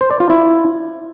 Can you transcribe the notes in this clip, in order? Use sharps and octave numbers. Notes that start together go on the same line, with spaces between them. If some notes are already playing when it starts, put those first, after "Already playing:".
C5
D5
F4
E4